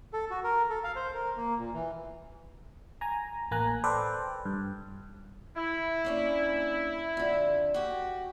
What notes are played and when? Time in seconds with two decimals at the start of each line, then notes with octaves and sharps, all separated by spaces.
0.13 A4
0.31 F#4
0.44 A#4
0.70 A4
0.84 F5
0.96 C5
1.14 A#4
1.36 A#3
1.58 A#2
1.73 E3
3.01 G#5 A#5
3.51 A1 A#3 G#5 A#5 F#6
3.84 A4 B4 C5 D5 G5
4.46 G2
5.56 E4
6.05 A#3 C#4 D4
7.17 F2 D3
7.74 F#4 G4